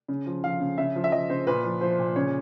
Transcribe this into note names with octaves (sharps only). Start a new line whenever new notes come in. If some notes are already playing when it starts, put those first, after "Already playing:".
C#3
F3
F3 F5
C#3
C#3 E5
F3
E5
F3 D#5
C#3 C5
A#2 B4
F3
F3 C5
A#2
C#3 C#5